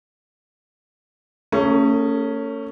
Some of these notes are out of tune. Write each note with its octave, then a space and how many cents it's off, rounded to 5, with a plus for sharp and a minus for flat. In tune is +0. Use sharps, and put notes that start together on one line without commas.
A3 +45 C#4 +0 G#4 +0